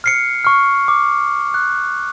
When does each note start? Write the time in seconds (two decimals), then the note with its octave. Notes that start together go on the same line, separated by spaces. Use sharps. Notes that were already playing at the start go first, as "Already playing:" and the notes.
0.04 F6 C7 C#7
0.45 C#6 F6
0.88 D6
1.54 F#6